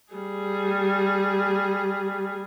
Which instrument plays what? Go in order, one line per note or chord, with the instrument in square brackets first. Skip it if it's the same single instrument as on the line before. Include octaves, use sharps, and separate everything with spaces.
[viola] G3 G#4